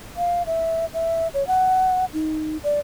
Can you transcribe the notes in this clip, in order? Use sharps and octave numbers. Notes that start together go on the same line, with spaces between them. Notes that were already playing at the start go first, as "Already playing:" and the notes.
F5
E5
E5
C#5
F#5
D#4
D5